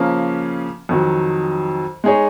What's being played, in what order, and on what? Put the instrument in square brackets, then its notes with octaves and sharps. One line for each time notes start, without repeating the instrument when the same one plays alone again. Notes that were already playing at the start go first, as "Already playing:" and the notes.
Already playing: [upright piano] C#3 F3 A#3 C#4
F2 D#3 F#3
G#3 D#4 G#4 C#5